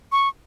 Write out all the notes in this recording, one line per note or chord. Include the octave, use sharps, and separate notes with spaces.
C#6